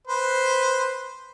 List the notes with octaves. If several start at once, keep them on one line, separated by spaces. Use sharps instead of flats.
B4 C5